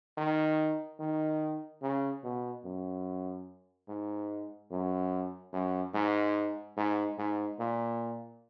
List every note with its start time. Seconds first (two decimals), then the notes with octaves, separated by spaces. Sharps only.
0.17 D#3
0.99 D#3
1.82 C#3
2.23 B2
2.65 F#2
3.88 G#2
4.71 F#2
5.53 F#2
5.94 G#2
6.77 G#2
7.18 G#2
7.60 A#2